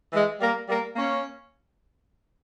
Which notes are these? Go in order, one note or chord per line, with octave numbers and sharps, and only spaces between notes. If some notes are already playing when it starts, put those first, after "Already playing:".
E3 G#3
G3 A#3
G3 A#3
A#3 C#4